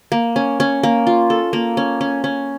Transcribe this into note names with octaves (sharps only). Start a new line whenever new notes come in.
A#3
C#4
C#4
A#3
F4
A4
A#3
C#4
C#4
C#4